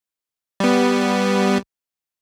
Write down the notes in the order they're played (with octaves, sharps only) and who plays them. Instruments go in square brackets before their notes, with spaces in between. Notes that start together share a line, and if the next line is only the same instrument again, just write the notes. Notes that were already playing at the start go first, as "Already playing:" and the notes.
[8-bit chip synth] G3 B3